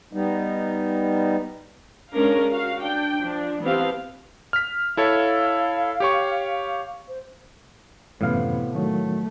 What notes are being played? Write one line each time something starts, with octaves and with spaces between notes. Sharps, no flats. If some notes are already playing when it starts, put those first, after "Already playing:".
G3 B3 D#4
G#3 C#4 D4 A#4 F5
F#4 F5
D4 G5
F3 D4
E3 F3 B3 C4 G4 F5
F6 B6
E4 A4 C#5 F5
G4 C#5 C#6
C5
F#2 A2 C3 E3 F3 B3 F5
D#3 F#3 A3 F#4